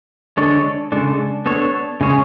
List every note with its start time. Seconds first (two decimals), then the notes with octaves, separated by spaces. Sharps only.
0.37 D3 G#3 D4 A4 C#5
0.92 C#3 G#3 D4 A4
1.46 B3 D4 A4 C#5
2.01 C#3 G#3 C#4 G#4 C#5